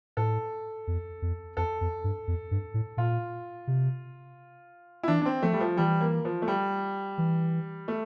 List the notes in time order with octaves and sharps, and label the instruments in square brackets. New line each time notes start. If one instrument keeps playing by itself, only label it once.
[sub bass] A2 [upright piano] A4
[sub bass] F2
F2
[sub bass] F2 [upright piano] A4
[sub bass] F2
G2
F2
G2
A2
[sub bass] A#2 [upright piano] F4
[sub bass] C3
[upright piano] E4
[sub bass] E3 [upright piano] D4
[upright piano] D4
C4
[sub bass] F3 [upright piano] A3
[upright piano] G3
F3
[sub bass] E3 [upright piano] G3
[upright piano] A#3
F3
A3
G3
[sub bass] E3
[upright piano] A3